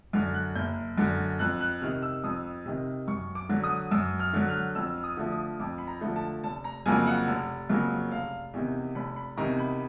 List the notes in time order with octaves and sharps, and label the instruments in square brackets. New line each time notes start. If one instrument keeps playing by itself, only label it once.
[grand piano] F#2 D3 F6
F#6
F#1 G6
F#2 D3
F2 F#6
F#6
C3 D#3 F6
E6
F2 D#6
C3 D#3
F#2 C#6
D6
D3 F#3
D#6
F#2 E6
F6
D3 F#3
F6
F2 E6
D#6
D3 F3 A3
D#6
F2 D6
B5
A#5
D3 F3 A3
A5
F1 A5
A#5
F2 C#3 F#3 A#3 G#5
F#5
F1
F2 C#3 F#3 A#3
F1 F5
E2 C3 D#3
F1 B5
B5
E2 C3 D#3 A#5
B5